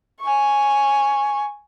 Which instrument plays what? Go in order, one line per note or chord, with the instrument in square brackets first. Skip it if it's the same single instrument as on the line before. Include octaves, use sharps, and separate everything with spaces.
[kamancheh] G#5 C#6